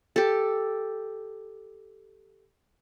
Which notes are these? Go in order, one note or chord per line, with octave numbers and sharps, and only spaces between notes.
G4 A4